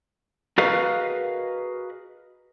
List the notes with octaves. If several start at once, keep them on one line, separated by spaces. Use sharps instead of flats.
F#4 G#4 A#4 B4 D#5 F5